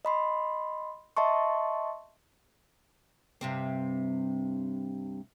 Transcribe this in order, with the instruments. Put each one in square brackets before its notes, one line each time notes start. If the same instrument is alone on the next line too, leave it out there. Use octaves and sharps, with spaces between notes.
[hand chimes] D#5 B5 C6
D#5 E5 A5 C6 C#6
[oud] G2 C3 C4